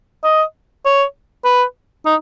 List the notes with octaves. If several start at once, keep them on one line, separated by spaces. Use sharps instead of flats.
D#5
C#5
B4
D#4